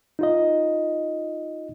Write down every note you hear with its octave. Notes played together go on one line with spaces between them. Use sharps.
D#4 F4 D#5